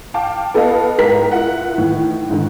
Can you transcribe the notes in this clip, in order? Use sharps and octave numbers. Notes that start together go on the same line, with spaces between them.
F5 G5 A5 D6
B3 A4 B4 D#5 F5
G#2 A#4 G5 A#5 B6
E4 F4 F#5
A2 D#3 E3
G#2 D3 D#3